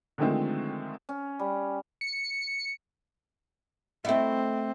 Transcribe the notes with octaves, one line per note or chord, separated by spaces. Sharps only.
D3 D#3 F3 G#3 A3 C4
C#4
G3
C#7
A3 C4 E4 D#5 E5